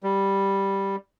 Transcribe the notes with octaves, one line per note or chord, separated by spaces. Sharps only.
G3